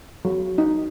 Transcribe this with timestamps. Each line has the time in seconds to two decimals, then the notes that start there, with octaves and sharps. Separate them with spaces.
0.25 F#3
0.58 D#4